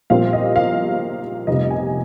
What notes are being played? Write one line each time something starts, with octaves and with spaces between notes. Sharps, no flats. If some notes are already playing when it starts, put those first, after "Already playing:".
A#1 A#2 G3 C4 F5
D#5
F5
F1 F2 C3 G3 D#5
G#5